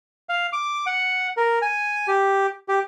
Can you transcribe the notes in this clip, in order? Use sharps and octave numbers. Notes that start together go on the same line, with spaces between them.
F5
D6
F#5
A#4
G#5
G4
G4